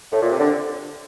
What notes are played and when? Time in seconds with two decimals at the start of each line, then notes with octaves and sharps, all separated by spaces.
0.12 A2
0.22 A#2
0.31 C3
0.40 D3